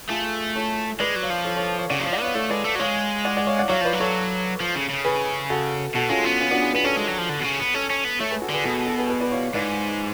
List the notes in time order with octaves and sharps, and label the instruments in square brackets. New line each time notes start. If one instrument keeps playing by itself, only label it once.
[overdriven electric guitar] A3 [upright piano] F4 G#4
[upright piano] A4 C#5
[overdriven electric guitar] G#3 [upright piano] B4 D5
[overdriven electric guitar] F#3
[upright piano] C#5 F5
[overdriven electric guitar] F3
[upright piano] A4 C#5
A4 C#5
C#5 F5
[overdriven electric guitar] C#3 [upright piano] D5 F#5
[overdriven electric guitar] F#3 [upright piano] C#5 F5
[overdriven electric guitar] F3
[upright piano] D5 F#5
[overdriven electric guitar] B3 [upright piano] C#5 F5
[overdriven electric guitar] A3 [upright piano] A4 C#5
[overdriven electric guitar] G#3 [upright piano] B4 D5
[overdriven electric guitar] A3
F#3
[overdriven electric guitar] G#3 [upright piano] C#5 F5
[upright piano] D5 F#5
D5 F#5
C#5 F5
D5 F#5
[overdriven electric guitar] F#3 [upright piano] C#5 F5
[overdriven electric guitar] F3 [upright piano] B4 D5
[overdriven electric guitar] F#3
[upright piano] A4 C#5
[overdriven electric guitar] F3
C#3
C#3
[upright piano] G#4 B4
F#4 A4
[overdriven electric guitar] B2 [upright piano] F#4 A4
[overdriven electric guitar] G#3 [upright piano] C#4 F4
[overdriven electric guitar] B3 [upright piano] C#4 F4
[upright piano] C#4 F4
D4 F#4
F4 G#4
[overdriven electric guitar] B3 [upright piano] G#4 B4
[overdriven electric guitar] C#4 [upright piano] A4 C#5
[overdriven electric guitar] G#3
F#3
F3
D3
B2
C#3
B3
[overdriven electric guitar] C#4 [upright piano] A4 C#5
[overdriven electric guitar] C#4
B3
[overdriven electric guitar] A3 [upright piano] A4 C#5
[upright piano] G#4 B4
F#4 A4
[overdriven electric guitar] D3 [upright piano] G#4 B4
[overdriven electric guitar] B2 [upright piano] F#4 A4
[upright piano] F#4 A4
G#4 B4
G#4 B4
B4 D5
C#5 F5
[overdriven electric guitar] G#2 [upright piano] B4 D5